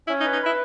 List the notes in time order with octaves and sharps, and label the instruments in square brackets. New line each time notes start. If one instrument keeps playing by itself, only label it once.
[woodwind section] C#4 [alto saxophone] E4
[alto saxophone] D#4
[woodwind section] B4
[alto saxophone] D#4
[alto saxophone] E4 [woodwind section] B4